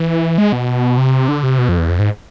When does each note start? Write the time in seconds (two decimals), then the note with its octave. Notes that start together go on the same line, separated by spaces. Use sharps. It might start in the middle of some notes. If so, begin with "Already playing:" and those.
Already playing: E3
0.38 G#3
0.52 B2
0.98 C3
1.28 D3
1.43 C3
1.58 B2
1.69 F2
1.78 E2
1.89 F2
1.99 G#2